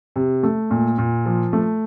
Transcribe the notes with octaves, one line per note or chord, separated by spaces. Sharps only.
C3
A3
A#2
A#2
F3
A3